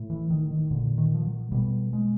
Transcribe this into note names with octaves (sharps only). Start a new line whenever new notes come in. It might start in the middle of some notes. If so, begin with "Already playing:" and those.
Already playing: A2
E3
D#3
D#3
A#2 D3
D#3
F3
F#3
B2 G3
G#3